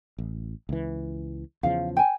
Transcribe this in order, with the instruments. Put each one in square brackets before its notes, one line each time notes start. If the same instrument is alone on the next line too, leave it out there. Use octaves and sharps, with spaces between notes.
[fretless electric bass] A1
C#2 E3
[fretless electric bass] E2 C#3 F3 [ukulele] F5
[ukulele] G5 G#5